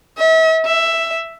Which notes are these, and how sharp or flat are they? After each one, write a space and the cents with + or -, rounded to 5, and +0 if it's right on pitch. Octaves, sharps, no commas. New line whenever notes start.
E5 -40
E5 +5